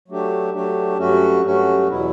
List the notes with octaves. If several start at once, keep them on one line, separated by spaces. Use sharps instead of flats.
F#3 A3 D4 G4
F#3 A3 D4 G4
G2 F#3 A3 C#4 F#4
G2 F#3 A3 C#4 F#4
E2 B2 F#3 B3 E4